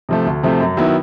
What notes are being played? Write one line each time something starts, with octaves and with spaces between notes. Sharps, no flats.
C3 F3 A3
D2
C3 F3 A3
F#2
D#3 F#3 B3 E4